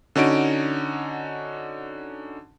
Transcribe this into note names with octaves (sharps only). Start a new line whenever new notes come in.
D3 C#4 D#4 F#4 D7